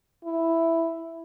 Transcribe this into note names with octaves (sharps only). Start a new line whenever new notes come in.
E4